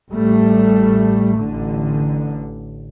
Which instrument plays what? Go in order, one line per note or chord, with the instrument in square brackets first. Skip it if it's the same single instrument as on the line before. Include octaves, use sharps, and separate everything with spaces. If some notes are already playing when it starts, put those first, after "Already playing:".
[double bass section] A1 G3 A3
A1 D3